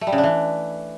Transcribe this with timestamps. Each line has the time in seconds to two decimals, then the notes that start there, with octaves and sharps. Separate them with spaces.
0.01 A3
0.07 G3
0.12 C#3
0.18 D4
0.23 E3